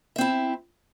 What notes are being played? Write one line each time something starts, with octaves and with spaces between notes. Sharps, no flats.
C4 E4 E5